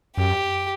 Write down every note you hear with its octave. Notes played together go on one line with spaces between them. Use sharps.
F#2 G4